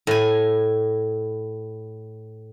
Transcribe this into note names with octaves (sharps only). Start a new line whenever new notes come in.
A2 G#5